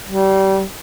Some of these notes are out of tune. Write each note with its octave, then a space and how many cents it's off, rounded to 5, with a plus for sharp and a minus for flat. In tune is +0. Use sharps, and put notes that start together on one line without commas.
G3 -25